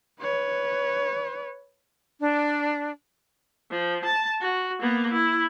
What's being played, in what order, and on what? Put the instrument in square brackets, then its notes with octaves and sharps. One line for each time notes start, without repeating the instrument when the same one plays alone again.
[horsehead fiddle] B4 C#5
[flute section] D4
[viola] F3
A5
F#4
A#3 B3
E4